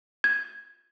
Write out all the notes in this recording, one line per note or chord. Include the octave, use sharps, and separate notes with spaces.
G#6